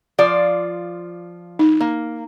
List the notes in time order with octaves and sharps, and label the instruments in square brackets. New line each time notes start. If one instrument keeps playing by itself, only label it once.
[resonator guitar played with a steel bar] F3 F4 D5
[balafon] D#4
[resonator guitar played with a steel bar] A#3